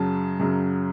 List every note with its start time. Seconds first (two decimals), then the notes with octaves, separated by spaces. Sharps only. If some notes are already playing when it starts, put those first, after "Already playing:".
Already playing: F#2 C#3 F#3 A5
0.39 F#2 C#3 F#3